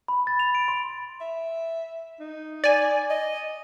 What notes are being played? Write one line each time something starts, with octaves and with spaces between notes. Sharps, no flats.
B5
A6
F7
D7
C6
E5
D#4
D5 G#5
D#5